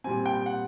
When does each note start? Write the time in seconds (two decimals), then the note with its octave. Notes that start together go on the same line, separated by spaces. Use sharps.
0.04 A#2 G3 C4 G#5
0.26 G5
0.46 F#5